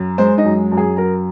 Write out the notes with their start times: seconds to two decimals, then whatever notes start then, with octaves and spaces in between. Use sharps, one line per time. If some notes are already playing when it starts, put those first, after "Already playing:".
Already playing: F#2
0.18 G#3 C5
0.38 D#4 D#5
0.45 F#2
0.72 F#2
0.77 G#4 G#5
0.97 F#3 A#4 A#5